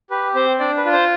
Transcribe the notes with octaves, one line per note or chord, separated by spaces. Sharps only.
G4 B4
C4 C5
D4 D5
B4
F4
C5